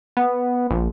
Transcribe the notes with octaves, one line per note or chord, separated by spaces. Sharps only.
B3
A#1